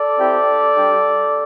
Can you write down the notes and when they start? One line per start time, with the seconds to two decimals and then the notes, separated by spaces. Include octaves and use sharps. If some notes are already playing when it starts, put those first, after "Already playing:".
Already playing: A4 D5
0.19 C4 E4 G4
0.76 G3 D4 G4